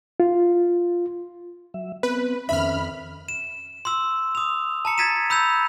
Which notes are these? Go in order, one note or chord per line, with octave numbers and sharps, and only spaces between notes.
F4
F#3 E5
B3 C4 B4
F2 D#3 C#4 E5 B5 F6
E7
C6 E6
D#6 F7
A5 A#5 C#7
G#6 A6 B6 D#7 E7
B5 E6 G6 G#6 F7